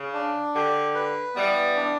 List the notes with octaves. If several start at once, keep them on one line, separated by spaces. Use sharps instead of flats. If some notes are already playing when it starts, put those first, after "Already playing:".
Already playing: C#3
D4
D3 G4
B4
E3 G3 B3
D4